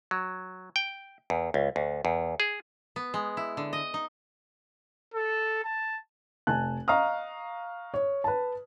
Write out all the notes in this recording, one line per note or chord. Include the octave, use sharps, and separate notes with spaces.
F#3
G5
E2
C#2
D2
E2
G#4
B3
G#3
E4
D3
D#5
D#4
A4
A5
F1 G#5 A5 F#6
D#5 F5 A#5 C#6 D#6 F6
C#5
B4 A5